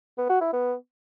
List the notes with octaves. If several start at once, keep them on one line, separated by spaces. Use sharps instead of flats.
B3
F#4
E4
B3